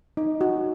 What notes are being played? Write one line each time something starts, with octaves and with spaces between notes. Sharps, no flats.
D#4
F#4